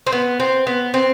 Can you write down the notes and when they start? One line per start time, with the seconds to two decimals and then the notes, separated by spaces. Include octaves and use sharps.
0.07 C4
0.12 B3
0.40 C4
0.67 B3
0.94 C4